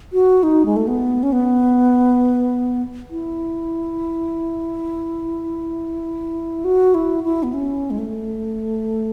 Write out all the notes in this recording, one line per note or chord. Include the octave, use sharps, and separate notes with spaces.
F#4
D#4
G#3
A3
B3
C#4
B3
E4
F#4
E4
E4
B3
C#4
G#3
A3